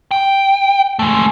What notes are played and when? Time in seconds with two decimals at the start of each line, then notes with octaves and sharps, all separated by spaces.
0.11 G5
0.99 G#3 A3